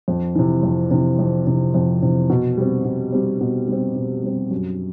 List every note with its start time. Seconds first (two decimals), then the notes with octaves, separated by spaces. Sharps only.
0.08 F2
0.35 C3 E3
0.63 F2
0.91 C3 E3
1.19 F2
1.47 C3 E3
1.74 F2
2.02 C3 E3
2.30 B2
2.57 G3 C4
2.85 B2
3.12 G3 C4
3.41 B2
3.68 G3 C4
3.96 B2
4.23 G3 C4
4.51 F#2